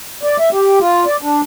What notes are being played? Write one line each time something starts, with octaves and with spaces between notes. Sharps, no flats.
D5
E5
G4
F4
D5
D4